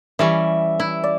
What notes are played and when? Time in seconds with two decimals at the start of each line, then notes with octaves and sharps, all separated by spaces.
0.19 E3 G3 C#4 E5
0.80 E4
1.04 D5